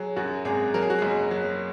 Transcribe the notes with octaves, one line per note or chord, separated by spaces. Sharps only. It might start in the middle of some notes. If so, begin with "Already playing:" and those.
Already playing: F#3 G#4
F#2 F#4
G#1 G#4
F#3 A#4
G#4
F#4
F#1 G#4
F#3